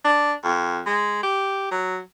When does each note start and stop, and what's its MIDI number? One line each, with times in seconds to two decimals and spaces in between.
0.05 0.32 62
0.44 0.79 41
0.86 1.18 56
1.23 1.67 67
1.71 1.99 54